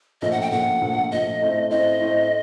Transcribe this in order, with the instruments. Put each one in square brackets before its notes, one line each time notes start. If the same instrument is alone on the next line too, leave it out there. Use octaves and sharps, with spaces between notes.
[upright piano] A#1 A#2 A3 [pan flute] D#5
[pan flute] F#5
G5
[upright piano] A#1 A#2 A3 [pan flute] F#5
[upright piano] A#1 A#2 A3
[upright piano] A#1 A#2 A3 [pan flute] D#5
[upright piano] A2 A3 C4
[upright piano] A2 A3 C4 [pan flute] D#5
[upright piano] A2 A3 C4